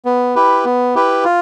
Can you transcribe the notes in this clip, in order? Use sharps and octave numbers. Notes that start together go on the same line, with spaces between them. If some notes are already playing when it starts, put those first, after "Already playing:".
B3
E4 G4 B4
B3
E4 G4 B4
F4